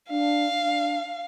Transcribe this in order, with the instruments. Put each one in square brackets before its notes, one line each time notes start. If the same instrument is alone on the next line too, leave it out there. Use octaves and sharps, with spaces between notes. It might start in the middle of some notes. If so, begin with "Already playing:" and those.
[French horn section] D4 [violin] F5
[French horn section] D4